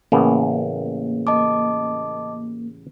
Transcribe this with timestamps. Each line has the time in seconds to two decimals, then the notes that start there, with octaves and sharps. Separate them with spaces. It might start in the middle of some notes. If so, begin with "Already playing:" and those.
0.12 A1 C#3 A#3 B3
1.27 D#5 A5 D6